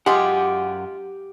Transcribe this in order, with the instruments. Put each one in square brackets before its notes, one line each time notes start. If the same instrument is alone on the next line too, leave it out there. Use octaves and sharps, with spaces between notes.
[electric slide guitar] F#2 F#5 [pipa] G#3 F4 [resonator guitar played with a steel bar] G4